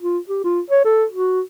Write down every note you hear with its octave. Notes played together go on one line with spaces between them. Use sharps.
F4
G4
F4
C#5
A4
F#4